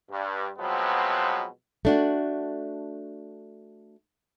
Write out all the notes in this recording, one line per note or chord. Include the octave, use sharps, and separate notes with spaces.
G2
B2 F3 F#3 G#3 B3 C4
A3 D4 F#4